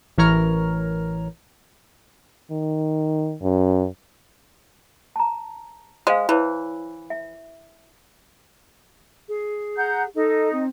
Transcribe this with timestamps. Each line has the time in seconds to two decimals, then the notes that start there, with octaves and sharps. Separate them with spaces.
0.18 A1 E3 A#4 C#5 A#5 F6
2.51 D#3
3.42 F#2
5.16 A5 A#5
6.07 G#3 C5 F5
6.29 E3 E4 B4 C#5
7.10 E5
9.28 G#4
9.77 F#5 A#5 G6
10.15 D#4 A4
10.52 C4